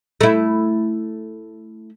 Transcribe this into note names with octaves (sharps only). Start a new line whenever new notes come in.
A3 E4